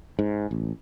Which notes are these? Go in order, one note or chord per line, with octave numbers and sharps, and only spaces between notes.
G#2
A1